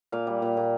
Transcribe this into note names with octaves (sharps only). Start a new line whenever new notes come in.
A#2 F5
G3
A#2
A#2